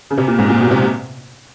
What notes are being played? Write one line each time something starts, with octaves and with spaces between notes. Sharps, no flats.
C#3
C3
A#2
G#2
A#2
B2
C3